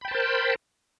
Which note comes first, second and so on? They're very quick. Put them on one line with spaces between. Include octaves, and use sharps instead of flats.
B5 G5 A5 C5 A#4